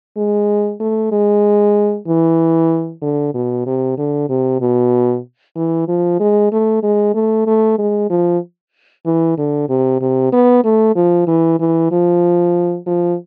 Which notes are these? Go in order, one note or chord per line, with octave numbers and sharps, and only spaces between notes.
G#3
A3
G#3
E3
D3
B2
C3
D3
C3
B2
E3
F3
G#3
A3
G#3
A3
A3
G#3
F3
E3
D3
C3
C3
B3
A3
F3
E3
E3
F3
F3